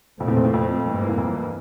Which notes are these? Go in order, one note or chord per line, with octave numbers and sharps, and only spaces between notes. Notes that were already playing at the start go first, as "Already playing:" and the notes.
F2 A#2 A3 C4
E2
F2
E2
F2
G2 E3 A#3
E2
F2